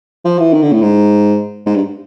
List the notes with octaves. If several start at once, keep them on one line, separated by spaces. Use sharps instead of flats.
F3
E3
D#3
D3
A2
G#2
G#2
G2